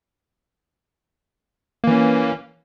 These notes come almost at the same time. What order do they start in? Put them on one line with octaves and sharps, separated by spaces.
A#3 E3 C#4